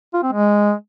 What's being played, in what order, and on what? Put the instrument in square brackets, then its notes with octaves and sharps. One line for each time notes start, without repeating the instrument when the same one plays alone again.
[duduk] F4
C4
G#3